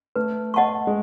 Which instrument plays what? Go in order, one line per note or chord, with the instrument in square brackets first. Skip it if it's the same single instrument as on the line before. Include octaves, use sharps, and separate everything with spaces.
[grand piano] A3 [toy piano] B4
[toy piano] D#5 F#5 A5 C#6
[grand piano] G#3